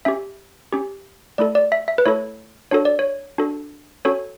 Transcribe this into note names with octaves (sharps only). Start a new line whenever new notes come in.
C#4 G4 E5
C#4 G4
A3 E4 A4 D5
D5
E5
E5
B4
A3 E4 A4 C#5
D4 F#4 A4 C#5
D5
C#5
D4 F#4 A4
C#4 F#4 A4 C#5